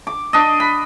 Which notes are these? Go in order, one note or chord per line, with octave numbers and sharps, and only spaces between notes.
D6
D4 D#5
B5